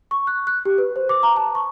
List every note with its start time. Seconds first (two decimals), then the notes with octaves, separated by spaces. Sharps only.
0.11 C#6
0.27 F#6
0.47 F#6
0.65 G4
0.78 B4
0.96 C5
1.09 D6
1.23 A#5
1.36 A5
1.55 C#6